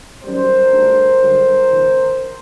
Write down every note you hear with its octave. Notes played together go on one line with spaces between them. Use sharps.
F#2 D#3 G3 A#4 C5
D2 D3 G3
G2 D3 F#3
D2 C3 E3